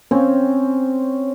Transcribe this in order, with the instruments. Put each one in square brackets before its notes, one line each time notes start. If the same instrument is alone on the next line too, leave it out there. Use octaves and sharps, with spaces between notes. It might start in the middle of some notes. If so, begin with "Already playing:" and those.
[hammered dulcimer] C4 C#4